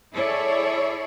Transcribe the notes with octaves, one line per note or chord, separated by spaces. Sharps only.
E4 G#4 A4 C#5 D5